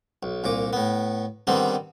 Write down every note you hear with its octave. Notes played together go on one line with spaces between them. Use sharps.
B1
C2 A#2 D6
A2 B3
D3 D#3 G3 B3 C4